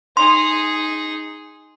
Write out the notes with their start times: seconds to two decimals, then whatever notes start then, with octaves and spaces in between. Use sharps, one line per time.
0.17 D#4 G#4 C6